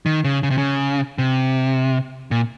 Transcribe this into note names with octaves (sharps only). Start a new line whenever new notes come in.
D#3
C#3
C#3
C3
C#3
C3
A#2